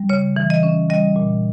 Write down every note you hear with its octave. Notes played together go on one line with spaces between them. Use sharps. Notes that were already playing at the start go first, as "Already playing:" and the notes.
Already playing: G3
C#3 C#5
E3
D#5
C#4
G3 D#5
A#2